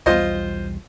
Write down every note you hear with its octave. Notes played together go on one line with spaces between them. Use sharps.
B1 E2 G3 F4 C5 D#5